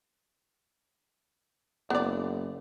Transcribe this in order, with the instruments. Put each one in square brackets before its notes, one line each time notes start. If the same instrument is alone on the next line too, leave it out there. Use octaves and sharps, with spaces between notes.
[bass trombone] F#1 [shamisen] B3 D5